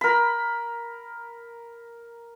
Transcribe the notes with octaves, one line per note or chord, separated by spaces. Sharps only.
A#4 B5